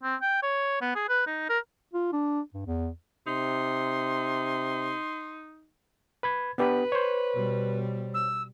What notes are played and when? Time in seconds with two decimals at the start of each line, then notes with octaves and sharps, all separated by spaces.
0.03 C4
0.22 G5
0.43 C#5
0.81 B3
0.95 G#4
1.09 B4
1.27 D#4
1.49 A#4
1.93 F4
2.13 D4
2.54 G2
2.66 E2
3.27 C3 D#4 C6
6.23 B4 B5 G#6
6.58 B3 D4 G4 B4
6.92 C5 C#5
7.33 B2 G3
8.14 E6